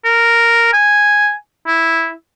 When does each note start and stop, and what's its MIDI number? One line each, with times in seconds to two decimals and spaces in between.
0.05 0.71 70
0.73 1.32 80
1.67 2.12 64